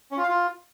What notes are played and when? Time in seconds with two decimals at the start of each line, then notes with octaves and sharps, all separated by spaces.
0.12 C#4
0.17 F4
0.23 F5
0.29 F4